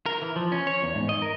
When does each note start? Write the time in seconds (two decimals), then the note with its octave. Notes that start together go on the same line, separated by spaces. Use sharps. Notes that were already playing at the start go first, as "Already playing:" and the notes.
0.06 A#4
0.22 E3
0.36 F3
0.52 C#4
0.67 C#5
0.83 E2
0.95 G#2
1.09 D#5
1.22 A#4